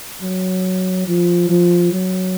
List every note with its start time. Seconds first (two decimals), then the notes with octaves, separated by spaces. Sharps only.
0.22 F#3
1.07 F3
1.49 F3
1.93 F#3